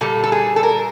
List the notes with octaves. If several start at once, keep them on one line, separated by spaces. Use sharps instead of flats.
A#2 G3 A4
A4
G#4
A4
A#4